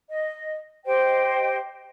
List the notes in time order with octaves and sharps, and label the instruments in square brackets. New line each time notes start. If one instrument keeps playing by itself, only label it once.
[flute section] D#5
G4 C5 D#5 G5